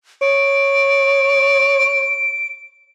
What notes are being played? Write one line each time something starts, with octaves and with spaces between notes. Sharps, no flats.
C#5 D7